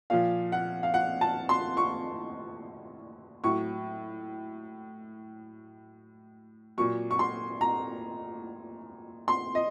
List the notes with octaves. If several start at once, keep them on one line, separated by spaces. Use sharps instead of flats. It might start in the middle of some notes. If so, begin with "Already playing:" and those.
A#2 F3 F5
F#5
F5
F#5
A5
C6
C#6
A2 F#3 C#6
A#2 F#3 C#6
C#6
C6
A#5
C6
D#5